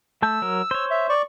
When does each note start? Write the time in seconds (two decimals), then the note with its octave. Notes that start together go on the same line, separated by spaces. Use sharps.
0.22 A3 A5 E6 G6
0.42 F#3 A#4
0.71 C5 C#5
0.91 E5
1.09 D5 C#6